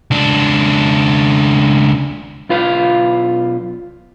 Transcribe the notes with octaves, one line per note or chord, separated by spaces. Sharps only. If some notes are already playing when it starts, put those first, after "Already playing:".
C#2 D4
B1 F4 B4 F5